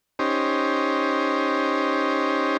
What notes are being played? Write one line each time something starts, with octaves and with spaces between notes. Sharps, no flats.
C#4 D#4 G4 C5